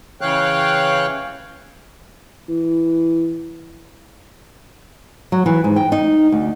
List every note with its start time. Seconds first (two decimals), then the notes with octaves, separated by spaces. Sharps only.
0.21 C#3 E3 C#5 F5 G5 F#6
2.49 E3
5.32 F#3
5.46 E3
5.64 G#2
5.76 G5
5.92 D#4
6.32 D2